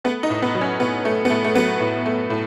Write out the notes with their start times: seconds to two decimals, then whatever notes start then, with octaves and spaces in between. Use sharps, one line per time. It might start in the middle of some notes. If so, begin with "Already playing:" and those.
0.04 A3 B3
0.23 D#4
0.30 A2
0.42 B3
0.55 F#3
0.61 C#4
0.80 A2 B3
1.05 A3
1.25 B3
1.30 A2 A3
1.44 A3
1.55 F#3 B3
1.80 A2
2.06 A3
2.30 A2